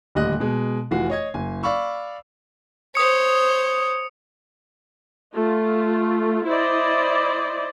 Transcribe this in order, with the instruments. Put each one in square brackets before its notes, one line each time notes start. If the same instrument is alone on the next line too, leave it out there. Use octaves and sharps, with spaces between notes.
[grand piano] D#1 D2 G3 D#5 F#6
B2 G#3
F1 E3 F4 F#4 C7
C#5 D#5 G#6
F#1 G#5
D5 F5 B5 C#6 E6
[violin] C5 C#5 [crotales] D#6 C#7
[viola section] A3 F4
E4 C5 D5 D#5